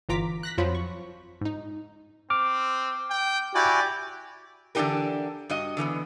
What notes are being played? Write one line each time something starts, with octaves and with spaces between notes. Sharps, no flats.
G1 E3 F4 A#5 D6 B6
F#6 A#6 B6
F2 F3 F#3 F4 B5
C#6
G#2 D#4
C4 D6 F6
G5
E4 F#4 G4 D5 G#5
D3 E3 D4 D#4 G4 A#4
G2 F#4 D#5
D3 E3 A#3 B3